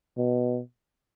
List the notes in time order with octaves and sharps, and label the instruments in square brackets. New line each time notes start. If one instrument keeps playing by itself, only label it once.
[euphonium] B2